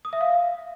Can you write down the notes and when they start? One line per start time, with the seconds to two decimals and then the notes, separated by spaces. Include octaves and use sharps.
0.05 D#6
0.13 E5
0.21 F5